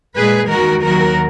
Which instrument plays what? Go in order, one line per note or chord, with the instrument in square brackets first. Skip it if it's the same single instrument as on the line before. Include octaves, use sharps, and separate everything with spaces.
[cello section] A#2 G#3 G#4 B4
D#2 D#3 G#3 F#4 A#4
D#2 D#3 F#3 F#4 A#4